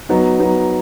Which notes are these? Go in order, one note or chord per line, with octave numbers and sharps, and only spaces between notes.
F#3 B3 D#4
F#3 B3 D#4